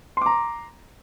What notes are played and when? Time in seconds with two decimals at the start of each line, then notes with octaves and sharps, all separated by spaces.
0.17 C6
0.22 D6
0.26 A#5